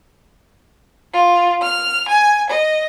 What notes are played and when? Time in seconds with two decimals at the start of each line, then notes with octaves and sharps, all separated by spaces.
1.13 F4
1.62 F6
2.08 G#5
2.49 D#5